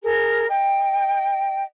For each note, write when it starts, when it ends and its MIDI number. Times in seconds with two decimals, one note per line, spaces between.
0.03 0.46 68
0.03 0.46 70
0.49 1.63 75
0.49 1.63 79